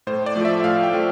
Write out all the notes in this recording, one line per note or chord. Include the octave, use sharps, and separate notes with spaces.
A2 C5
D5
F3 A3
E5
A2 F5
G5
F3 A3